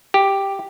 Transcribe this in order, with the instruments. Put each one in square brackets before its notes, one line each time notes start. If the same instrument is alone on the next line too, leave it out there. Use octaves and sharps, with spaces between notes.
[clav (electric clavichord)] G4